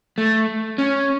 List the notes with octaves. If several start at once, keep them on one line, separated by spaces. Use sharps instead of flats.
A3
C#4